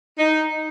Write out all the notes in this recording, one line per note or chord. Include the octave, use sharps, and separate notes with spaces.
D#4